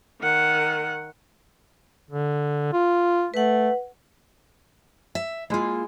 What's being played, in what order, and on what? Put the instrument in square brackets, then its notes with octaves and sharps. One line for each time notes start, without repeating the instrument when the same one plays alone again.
[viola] D#3 F#5
[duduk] D3
F4
[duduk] A3 [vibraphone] B4 F#5
[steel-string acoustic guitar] E5
[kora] G#3 E4 [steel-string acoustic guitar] A#3 F4